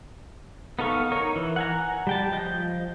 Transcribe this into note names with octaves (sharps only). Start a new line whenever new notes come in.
B3 D#4 A4 F5 C#6
D#4 A#4 C#5 C#6
E3
F#5 G#5 A#5
G3 G5 A5
F3 D#5 G6